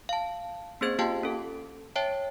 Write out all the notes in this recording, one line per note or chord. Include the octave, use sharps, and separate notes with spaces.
F5 A5
A#3 C4 C#4 G#4 C5 G#6
A#3 F4 G4 F5 G5 A5
C#4 A4
C#5 E5 G5 A5